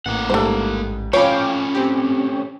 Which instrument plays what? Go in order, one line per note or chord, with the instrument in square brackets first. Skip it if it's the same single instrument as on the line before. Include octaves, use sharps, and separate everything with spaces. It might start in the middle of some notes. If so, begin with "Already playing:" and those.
[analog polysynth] A1 [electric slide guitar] A#3 F#5
[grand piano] G#2 G3 [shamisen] A3 C5
[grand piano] F3 B5 [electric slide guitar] A3 C#4 [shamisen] C#5 [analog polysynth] F5 G5 D6
[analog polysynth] C4 G4